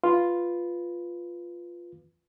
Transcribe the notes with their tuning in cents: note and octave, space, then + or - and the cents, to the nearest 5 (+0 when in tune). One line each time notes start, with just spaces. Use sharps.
F4 +0 B4 +0